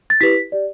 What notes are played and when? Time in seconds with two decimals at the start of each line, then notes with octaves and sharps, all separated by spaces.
0.10 A6
0.21 E4 G4 B4 B6
0.52 G4 D5